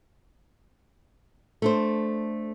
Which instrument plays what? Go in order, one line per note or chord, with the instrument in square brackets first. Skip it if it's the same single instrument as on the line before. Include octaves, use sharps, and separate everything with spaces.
[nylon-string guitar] A3 D4 C5